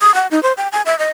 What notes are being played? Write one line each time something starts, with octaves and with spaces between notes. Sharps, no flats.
D#6
F#5
D#4
C5
G5
G#5
E5
D#5